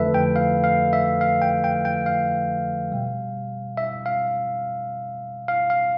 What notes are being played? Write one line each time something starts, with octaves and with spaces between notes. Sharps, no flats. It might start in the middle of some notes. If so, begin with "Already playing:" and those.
Already playing: F2 D3 F3 A3 A4 B4 E5
G5
F5
F5
E5
F5
G5
G5
G5
F5
B2 G3
E5
F5
F5
F5